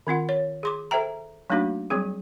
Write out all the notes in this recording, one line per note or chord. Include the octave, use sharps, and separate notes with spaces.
D#3 C4 F4 F#5
C#5
G#4 C6 D6
A4 C5 E5 G5 A#5
F#3 A3 A#3 D4 D#4 F#4
F#3 G3 C4 G#4